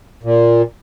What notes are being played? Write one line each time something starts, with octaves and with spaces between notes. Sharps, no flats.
A#2